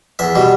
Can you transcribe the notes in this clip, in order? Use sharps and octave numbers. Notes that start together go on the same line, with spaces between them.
E2 E5
B2 G3